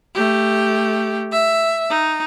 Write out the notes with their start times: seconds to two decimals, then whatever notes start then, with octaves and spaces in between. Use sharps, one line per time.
0.15 A3 G4
1.32 E5
1.89 D#4